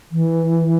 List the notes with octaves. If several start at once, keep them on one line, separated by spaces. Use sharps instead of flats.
E3